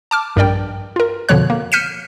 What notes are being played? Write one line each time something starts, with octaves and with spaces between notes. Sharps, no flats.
A5 D6 F6
A#1 G2 A#4 D5 G5
F4 A#4
F2 B2 D3 F3 C#5 F#6
A#3
F6 G6 B6 C#7 D#7 E7